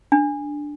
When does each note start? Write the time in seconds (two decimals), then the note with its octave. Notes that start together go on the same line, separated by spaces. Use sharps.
0.12 D4